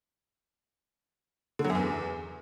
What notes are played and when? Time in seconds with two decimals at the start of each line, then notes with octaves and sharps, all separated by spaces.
1.59 D3
1.64 F#3
1.70 F#2
1.75 E2